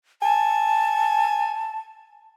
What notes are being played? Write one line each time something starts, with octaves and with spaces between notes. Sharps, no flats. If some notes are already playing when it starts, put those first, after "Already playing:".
G#5 A5